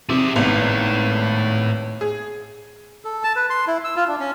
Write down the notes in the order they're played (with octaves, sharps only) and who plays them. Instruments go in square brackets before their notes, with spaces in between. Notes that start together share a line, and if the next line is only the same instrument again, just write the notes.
[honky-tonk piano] C3 [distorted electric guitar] G#4 E5
[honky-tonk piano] G#1 B3 F7 [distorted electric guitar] A2
[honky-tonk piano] G#4
[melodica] A4
A5
B4
C6
E4
E6
F4
D4
C#4